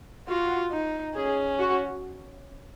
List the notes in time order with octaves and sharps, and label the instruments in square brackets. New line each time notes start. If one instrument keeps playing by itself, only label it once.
[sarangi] F4 [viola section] F#4
[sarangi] D#4
[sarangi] C#4 [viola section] G#4
[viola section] F#4